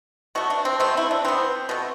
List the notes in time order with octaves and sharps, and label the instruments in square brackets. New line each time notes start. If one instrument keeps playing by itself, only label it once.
[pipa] B2 A3 F#4
D4
C4
B2 A3 C4
E4
D4
E3 B3 C4
B2 A3